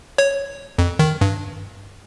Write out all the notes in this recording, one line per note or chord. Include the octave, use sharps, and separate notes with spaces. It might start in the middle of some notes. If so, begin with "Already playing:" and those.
C#5
F2
D#3
G2